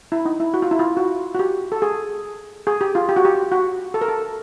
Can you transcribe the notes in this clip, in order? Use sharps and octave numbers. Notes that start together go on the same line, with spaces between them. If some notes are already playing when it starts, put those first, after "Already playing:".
E4
D#4
E4
F#4
F4
E4
F4
F#4
F#4
G4
A4
G#4
G#4
G4
F4
G4
F#4
G4
F#4
A4
A#4
A4